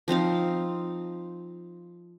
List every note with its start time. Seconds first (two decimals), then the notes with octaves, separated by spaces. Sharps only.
0.08 F3 C4 D#4 F5